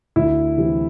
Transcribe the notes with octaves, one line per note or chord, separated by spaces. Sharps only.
D2 E4
C3 E3 G3